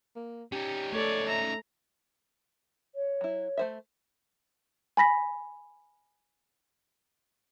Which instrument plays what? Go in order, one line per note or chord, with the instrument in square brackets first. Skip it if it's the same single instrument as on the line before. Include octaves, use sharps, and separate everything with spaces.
[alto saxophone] A#3
[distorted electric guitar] C#4 D#4 [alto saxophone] G4
[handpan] A3 A4 [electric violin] C#5 D5
[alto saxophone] E5 [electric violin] A#5
[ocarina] C#5
[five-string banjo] F#3 E4
A3 C5 E5
[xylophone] G#5 B5 A#6 B6